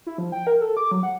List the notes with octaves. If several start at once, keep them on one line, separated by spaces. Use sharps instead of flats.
E4
F3
G5
A#4
A4
D6
F#3
F#5